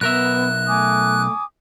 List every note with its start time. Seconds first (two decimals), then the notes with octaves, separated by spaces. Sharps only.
0.01 B1 B3 A#4 E5 F#6
0.67 A3 G#5 D6 D#6